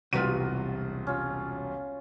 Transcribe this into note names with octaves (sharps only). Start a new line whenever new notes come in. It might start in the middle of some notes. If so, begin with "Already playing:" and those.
E1 C2 C3 G3 F4 F#4 B4 D#7
C#4 F4